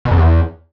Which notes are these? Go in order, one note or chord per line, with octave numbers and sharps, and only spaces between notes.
B2
F2
E2